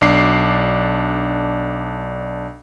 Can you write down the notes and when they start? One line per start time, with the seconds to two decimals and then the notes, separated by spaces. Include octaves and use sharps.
0.01 B1 D4 D6 C7